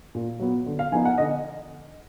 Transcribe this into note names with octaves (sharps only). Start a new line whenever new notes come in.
A#2
F#3 B3
D3
F5
F3 B3 D#4 G#5
F#5
D3 D#5